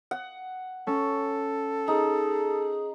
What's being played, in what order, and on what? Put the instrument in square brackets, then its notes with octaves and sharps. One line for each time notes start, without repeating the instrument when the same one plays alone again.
[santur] F#5
[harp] C#4 [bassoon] A4
[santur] D#4 [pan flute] G#4